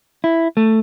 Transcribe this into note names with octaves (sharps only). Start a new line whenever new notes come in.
E4
A3